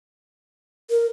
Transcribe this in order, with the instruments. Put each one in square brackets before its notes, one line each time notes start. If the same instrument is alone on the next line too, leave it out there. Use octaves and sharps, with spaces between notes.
[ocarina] A#4